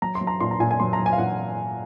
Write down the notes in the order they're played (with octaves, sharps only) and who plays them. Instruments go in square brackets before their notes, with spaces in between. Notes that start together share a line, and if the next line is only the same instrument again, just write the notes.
[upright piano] F#3 A#5
C6
F#3
A#5
A#2 C6
A#5
A#2 G#5
G#5
F#3 C6
A#5
F#3
G#5
F5
A#2 F#5